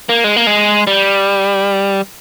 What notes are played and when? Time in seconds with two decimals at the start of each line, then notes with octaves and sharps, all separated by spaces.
0.09 A#3
0.24 G#3
0.36 A#3
0.47 G#3
0.87 G3